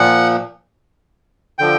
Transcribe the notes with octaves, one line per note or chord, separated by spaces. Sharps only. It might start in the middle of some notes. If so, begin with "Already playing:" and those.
Already playing: A#2 F3 F#5
D3 F3 G5